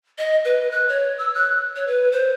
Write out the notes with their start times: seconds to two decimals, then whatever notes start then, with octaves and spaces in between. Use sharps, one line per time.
0.18 D#5
0.45 B4
0.71 F#6
0.89 C#5
1.18 E6
1.35 F#6
1.76 C#5
1.87 B4
2.12 C5